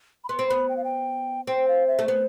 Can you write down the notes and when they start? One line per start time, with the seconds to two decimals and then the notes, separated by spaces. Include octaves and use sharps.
0.24 B5
0.29 B3 C6
0.39 C4
0.48 B3 B5
0.69 G5
0.77 F5
0.84 G5
1.47 C4 G5
1.68 F5
1.88 E5
1.99 A3
2.08 B3 C5